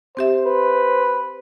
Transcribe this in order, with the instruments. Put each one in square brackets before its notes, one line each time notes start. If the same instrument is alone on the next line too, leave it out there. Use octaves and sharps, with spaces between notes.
[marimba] C4 G4 E5 [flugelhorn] C5
[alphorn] B4